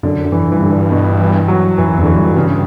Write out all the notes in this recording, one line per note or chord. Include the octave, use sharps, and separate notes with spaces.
F#2 D3
F#2
E3
G2 E3
D3
B2
E3
F#3
F#2 E3
E2 D3
E3
G2
C#3